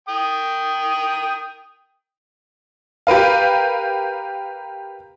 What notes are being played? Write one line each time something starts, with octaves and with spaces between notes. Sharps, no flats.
G5 D#6
G4 A#4 B4 F5